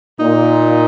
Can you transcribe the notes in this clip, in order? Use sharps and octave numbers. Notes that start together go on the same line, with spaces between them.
A#2 D#4